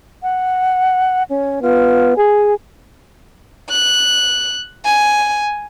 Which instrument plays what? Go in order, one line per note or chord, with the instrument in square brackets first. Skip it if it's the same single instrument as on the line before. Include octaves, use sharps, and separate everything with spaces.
[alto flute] F#5
C#4
[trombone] B3 [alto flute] F4
[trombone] G#4 [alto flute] G#5
[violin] F#6
G#5